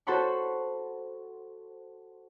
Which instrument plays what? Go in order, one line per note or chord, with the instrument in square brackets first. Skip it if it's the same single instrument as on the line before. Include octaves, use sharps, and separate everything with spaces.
[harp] F#4 A4 C5 F#5 B5 C#6